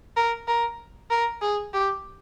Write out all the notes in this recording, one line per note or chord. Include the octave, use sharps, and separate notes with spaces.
A#4
A#4
A#4
G#4
G4